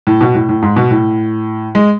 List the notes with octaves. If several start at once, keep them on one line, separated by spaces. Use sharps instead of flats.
A2
B2
A2
A2
G#2
B2
A2
G#3